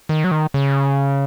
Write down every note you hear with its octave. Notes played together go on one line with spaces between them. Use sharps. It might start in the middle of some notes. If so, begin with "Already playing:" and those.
D#3
F#3
D#3
C#3